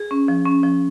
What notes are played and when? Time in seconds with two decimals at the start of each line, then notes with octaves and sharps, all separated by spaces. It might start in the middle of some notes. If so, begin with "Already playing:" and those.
Already playing: G#4
0.11 C#4
0.28 F3
0.45 C#4
0.63 F3